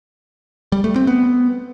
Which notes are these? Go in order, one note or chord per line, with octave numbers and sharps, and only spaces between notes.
G3
A3
C4
B3